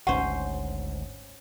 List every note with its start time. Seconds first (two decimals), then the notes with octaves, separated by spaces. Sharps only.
0.07 G#1 D2 G#2 C#4 C5 F#5